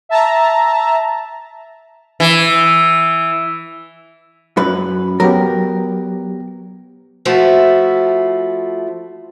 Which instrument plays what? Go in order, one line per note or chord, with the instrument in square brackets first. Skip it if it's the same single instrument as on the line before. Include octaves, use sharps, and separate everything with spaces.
[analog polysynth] E5 A5 A#5
[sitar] E3
[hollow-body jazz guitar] F#2 B4
[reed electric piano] F#3 B3 G4 [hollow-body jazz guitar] A#4
[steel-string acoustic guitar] F3 A3 E4 F#4